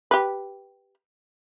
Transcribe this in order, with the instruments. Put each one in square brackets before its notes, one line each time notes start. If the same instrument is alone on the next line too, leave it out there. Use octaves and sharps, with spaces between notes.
[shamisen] G4 B4